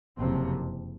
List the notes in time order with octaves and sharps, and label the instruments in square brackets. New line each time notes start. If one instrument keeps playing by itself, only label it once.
[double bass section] F#1 F2 C3 C4